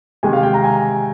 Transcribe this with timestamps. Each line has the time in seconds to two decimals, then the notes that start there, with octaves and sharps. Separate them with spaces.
0.23 C3 D#3 G#3 G#5
0.33 F5
0.43 G5
0.54 A#5
0.64 G#5